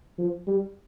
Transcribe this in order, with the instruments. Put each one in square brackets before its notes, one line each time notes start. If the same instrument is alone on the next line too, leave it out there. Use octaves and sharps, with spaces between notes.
[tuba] F3
G3